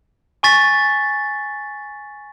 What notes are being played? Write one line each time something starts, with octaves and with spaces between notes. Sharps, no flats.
G#5 C#6 A6 B6